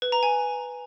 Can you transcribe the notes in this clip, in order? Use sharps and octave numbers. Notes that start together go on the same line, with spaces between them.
B4
A#5
G#5